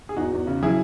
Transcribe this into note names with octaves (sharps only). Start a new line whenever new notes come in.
G#4
E2 D#4 F#4
E2
C#3
F#3 E4 G#4